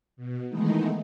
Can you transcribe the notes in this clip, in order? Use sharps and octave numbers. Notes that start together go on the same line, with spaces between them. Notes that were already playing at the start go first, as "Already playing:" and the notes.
B2
D#3 E3 G#3 A3 B3 D#4